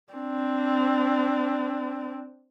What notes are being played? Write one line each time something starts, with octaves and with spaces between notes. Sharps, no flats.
C4 D4